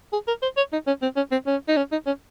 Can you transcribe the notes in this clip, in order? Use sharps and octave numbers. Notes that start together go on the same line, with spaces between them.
G#4
A#4
C5
C#5
D#4
C#4
C4
C#4
C4
C#4
D#4
C#4
D#4
C#4